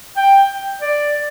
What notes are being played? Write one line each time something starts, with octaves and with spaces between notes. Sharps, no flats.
G5
D5